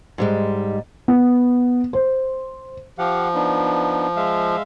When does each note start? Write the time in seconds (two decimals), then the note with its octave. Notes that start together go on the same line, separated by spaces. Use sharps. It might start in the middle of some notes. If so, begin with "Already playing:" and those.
0.18 G#2 G3 G#3
1.08 B3
1.93 C5
2.98 F3 G4 F5 F#5
3.34 B3 D4 D#4
4.16 G#3 E5 F5